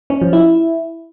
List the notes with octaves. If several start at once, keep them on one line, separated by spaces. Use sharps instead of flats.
C#4
F3
E4